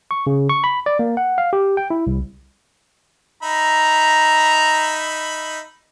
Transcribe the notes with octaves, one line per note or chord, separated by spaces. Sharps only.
C#6
C#3
C#6
B5
D5
A#3
F#5
F5
G4
G5
E4
C2
D#4 E5 A#5 B5